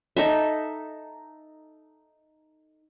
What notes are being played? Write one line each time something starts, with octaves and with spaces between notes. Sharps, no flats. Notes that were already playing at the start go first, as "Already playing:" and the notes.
D#4 A4 E5